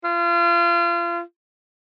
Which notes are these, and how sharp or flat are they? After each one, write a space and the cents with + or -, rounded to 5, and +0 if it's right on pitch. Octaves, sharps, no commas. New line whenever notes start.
F4 -30